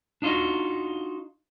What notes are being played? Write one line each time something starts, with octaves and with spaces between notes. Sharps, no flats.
D4 D#4 F4 F#4 D#5